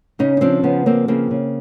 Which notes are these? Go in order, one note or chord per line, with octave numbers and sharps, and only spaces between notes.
C#3 C#4 D#4
D#4
F3 C4 D4
C#3 B3 C#4
F3 A#3 C4
C#3 A#3 C4
C#3